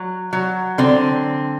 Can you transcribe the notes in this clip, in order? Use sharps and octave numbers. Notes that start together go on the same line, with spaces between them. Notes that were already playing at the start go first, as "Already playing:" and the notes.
Already playing: F#3
F#3
D3 C4